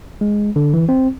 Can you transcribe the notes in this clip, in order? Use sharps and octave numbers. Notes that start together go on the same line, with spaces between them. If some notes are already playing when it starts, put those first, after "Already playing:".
G#3
D3
E3
C4